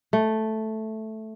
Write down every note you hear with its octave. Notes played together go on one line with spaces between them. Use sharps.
A3